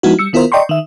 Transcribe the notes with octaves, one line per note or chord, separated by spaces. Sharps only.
F3 G#3 B3 D#4 E4 F#4
G3 E6 C#7
D#3 B3 E4 F4 A#4 C5
D5 D#5 G5 A#5 C6 C#6
D#3 E5